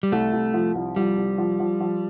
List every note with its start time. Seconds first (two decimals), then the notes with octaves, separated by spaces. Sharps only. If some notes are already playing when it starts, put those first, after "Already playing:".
0.03 G3
0.12 C2 A3
0.33 C2
0.54 F3
0.75 C2
0.96 F3 G3
1.18 C2
1.38 F3
1.60 F3
1.81 F3